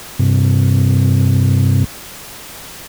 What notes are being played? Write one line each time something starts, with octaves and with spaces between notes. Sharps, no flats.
G2 C3